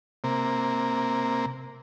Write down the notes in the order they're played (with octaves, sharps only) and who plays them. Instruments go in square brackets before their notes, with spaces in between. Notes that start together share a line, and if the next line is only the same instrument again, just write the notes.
[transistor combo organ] C3 A#3